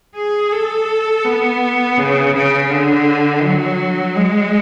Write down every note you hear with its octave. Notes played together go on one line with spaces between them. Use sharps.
G#4
A4
B3
C#3
C#3
D3
F#3
G#3